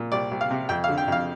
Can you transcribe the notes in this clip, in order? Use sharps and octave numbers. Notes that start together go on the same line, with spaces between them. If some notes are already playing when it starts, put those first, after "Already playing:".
Already playing: A#2
C2 D5
C2
F5
C3
F2 G5
F5
D3
G5
F2 F5